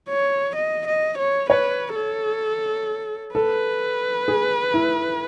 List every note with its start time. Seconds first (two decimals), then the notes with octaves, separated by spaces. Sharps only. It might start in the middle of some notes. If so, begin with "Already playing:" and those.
0.09 C#5
0.56 D#5
0.87 D#5
1.18 C#5
1.50 B4 C#5
1.95 A4
3.35 A4 B4
4.28 G#4
4.74 E4